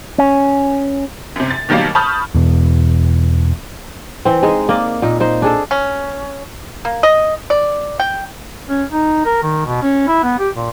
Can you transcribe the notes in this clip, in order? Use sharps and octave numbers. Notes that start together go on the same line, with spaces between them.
C#4
F#2 C3
A6
B2 D#3 F#3 G3 A#3
A5 B5 C#6 D#6 F6 G6
E2 B2
E3 C4
G#3 D#4 G#4 D#5
A#3 D#4 D5 D#5
A#2 D#4
D#4 C5
D4 G#4 A4
C#4
A#3
D#5
D5
G5
C#4
D#4
A#4
D#3
B2
C#4
E4
B3
G4
A#2